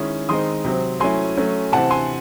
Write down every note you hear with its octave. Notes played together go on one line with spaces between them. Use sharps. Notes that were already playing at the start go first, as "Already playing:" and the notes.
Already playing: D#3 G#3 C#4 E4 D#6
D#3 G#3 C4 D#4 C6 D#6
C3 F#3 C4
F#3 A3 C#4 E4 G#5 C6
F#3 A3 C#4
C3 E3 C4 F#5 A5
G#5 C6